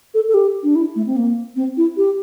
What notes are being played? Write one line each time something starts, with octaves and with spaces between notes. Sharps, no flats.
A4
A4
G4
D4
E4
A3
C4
A#3
C4
E4
G4